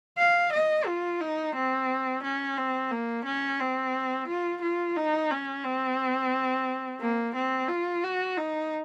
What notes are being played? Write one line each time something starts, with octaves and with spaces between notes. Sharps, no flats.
F5
D#5
F4
D#4
C4
C#4
C4
A#3
C#4
C4
F4
F4
D#4
C#4
C4
A#3
C4
F4
F#4
D#4